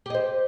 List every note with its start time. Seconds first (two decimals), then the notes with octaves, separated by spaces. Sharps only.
0.06 G4
0.10 D#5
0.14 C5